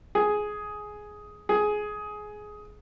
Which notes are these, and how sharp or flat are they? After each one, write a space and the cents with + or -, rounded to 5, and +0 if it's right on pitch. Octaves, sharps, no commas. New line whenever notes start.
G#4 +10
G#4 +15